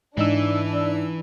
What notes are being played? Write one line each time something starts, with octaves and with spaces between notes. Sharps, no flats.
G#2 E3 D4 D#4 E6